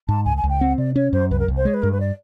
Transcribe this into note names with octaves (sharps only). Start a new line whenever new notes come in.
G#2 A5
C#2 G#5
G#5
C#2
G5
C4 F#5
C3 D5
C#4 C#5
F#2 C5
C2 B4
A#4
C2
C5
G#3 C#5
B4
G2 A#4
B4
D5